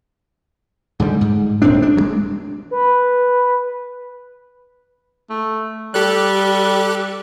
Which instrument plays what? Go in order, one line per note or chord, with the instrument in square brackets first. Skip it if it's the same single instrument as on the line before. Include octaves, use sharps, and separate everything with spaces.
[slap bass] G#2 D3 F#3 G3
G#2
D#1 G#1 C4 D4
D4
F#3 G#3
[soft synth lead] B4
[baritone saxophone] A3
[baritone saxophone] G3 [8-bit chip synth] G4 A4 F#6